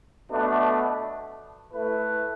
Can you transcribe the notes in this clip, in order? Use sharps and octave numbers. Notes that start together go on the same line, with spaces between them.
B2 A3 D4
A3 E4 B4